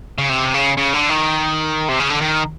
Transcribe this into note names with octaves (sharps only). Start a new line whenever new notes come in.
C#3
C3
C#3
C#3
D3
D#3
C3
C#3
D3
D#3